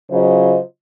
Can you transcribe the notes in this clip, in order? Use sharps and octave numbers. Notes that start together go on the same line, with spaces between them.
C#3 F#3 F4 C5 D#5